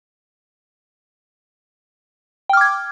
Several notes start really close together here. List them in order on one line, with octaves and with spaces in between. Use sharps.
G5 F6 D6 G#6